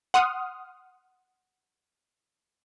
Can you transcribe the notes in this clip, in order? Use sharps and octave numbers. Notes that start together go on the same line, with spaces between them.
F#5 C6 D#6 F6